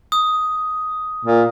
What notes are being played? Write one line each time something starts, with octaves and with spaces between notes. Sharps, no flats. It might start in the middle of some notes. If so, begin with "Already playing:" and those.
D#6
A#2